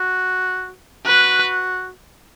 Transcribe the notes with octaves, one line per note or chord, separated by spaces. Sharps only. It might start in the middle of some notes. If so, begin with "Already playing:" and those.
Already playing: F#4
F#4 B4